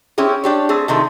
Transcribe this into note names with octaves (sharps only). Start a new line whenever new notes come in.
C4 C#4 E4 G4 G#4
D4 G4 C#5
A3 C4 G#4
C3 D#3 F3 A3